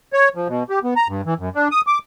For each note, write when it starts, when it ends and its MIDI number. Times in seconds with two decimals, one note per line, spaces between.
0.13 0.29 73
0.35 0.48 53
0.48 0.63 47
0.70 0.79 67
0.83 0.94 59
0.96 1.08 82
1.09 1.21 43
1.26 1.34 52
1.39 1.49 42
1.55 1.68 62
1.71 1.81 87
1.87 1.99 86